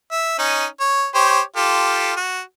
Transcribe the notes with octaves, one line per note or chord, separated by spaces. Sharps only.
E5
C#4 D#4
C#5
G4 C5 C#5
F4 G4 A4
F#4